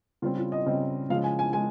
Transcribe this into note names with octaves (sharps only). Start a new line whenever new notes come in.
C#3 G3 C4 F4
F4
D#5
C#3 G3 C4 D#5
C#3 F3 G#3 F5
G#5
G#5
G#3 G#5